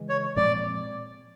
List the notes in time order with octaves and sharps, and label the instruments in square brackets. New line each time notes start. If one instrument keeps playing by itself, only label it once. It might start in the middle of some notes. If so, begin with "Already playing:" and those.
Already playing: [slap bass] C#3 E3 G#3
[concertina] C#5
[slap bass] A#2 F3 G#3 C4 [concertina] D5